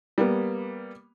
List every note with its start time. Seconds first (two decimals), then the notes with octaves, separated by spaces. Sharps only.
0.18 G3 A#3 B3